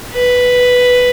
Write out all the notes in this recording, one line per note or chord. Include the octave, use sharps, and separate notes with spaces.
B4